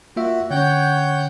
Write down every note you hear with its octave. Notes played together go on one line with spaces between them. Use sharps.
A#3 F4 F#4 E5
D3 C#4 C#5 F#5 G5 G6